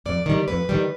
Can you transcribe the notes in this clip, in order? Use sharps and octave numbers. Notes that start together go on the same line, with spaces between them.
F2 D5
D#3 G3
F2 B4
D#3 G3